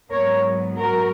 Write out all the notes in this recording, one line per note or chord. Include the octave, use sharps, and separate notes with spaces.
G#2 F#3 B3 A#4 C#5
F#4 A#4